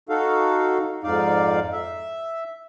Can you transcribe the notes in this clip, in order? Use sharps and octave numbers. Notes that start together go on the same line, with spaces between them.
D#4 F#4 A4 F5
F2 G#2 D#4 D5 F5
E5